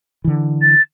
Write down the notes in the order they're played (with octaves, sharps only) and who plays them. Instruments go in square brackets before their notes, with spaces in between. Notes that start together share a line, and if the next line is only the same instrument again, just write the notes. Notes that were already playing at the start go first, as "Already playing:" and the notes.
[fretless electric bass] D3 E3
[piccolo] A6